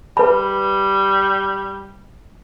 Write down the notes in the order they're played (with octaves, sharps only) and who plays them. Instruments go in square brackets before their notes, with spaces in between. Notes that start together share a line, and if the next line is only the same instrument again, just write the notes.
[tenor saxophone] G3 [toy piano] B4 B5